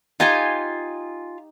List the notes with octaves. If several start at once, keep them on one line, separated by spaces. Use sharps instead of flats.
D#4 F4 G4 G5 G#5